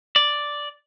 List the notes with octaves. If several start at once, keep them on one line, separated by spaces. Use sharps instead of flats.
D5